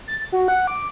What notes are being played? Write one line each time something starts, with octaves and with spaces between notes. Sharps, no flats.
A6
F#4
F#5
D6